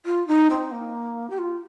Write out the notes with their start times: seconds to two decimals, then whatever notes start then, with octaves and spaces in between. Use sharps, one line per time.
0.06 F4
0.28 D#4
0.50 C4
0.72 A#3
1.30 G4
1.38 F4